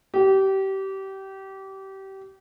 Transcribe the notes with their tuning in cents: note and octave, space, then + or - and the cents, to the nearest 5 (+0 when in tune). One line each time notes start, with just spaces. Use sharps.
G4 -25